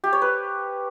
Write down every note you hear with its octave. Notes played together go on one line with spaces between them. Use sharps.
G4
C#5
B4